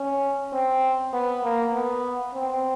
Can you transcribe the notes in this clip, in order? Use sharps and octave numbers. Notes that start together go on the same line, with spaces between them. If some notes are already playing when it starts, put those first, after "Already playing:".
Already playing: C#4
C4
B3
A#3
B3
C4